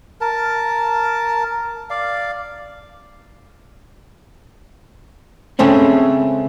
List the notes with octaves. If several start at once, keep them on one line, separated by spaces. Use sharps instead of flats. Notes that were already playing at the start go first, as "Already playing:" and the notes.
A#4 A5
D5 F5
C#3 G#3 A3 C4 C#4